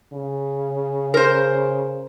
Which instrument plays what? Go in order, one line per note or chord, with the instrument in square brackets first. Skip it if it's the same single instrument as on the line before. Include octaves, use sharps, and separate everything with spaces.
[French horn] C#3
[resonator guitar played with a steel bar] A#4 C5